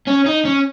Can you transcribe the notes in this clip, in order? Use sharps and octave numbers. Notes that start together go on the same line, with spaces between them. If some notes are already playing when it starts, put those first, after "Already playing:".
C#4
D#4
C#4